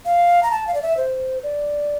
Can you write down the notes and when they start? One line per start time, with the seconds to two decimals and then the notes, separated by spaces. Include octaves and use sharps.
0.05 F5
0.43 A#5
0.51 A5
0.67 F5
0.74 D5
0.82 E5
0.97 C5
1.43 D5